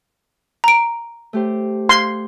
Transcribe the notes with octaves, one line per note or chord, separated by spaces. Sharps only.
A#5 D7
A3 G4 C5
C6